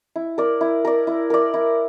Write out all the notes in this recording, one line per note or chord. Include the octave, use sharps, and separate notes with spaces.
E4
A#4 D5
E4
A#4 D5
E4
A#4 D5
E4